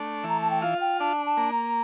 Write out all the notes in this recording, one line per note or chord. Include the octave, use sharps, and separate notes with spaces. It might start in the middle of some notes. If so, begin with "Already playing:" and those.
Already playing: A3 D4
E3 A#5
A5
G5
F4 F5
G5
D4 A5
A5
A#3
A#5